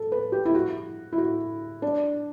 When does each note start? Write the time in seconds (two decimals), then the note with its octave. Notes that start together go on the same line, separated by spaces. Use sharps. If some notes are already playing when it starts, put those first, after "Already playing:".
Already playing: A4
0.12 B4
0.32 G4
0.45 E4
0.55 F#4
1.13 E4
1.18 F#4
1.82 D4